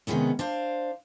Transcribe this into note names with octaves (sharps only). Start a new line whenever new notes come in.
C3 D#3 E3 G#3 B3 C#4
D4 C5 F5